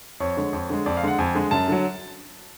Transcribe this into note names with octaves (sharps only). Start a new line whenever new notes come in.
F2 C#5
D3 G#3
F2
D3 G#3
F2 D5
F5
D3 G#3 F#5
F2 G#5
D3 G#3
F#2 A5
D3 F#3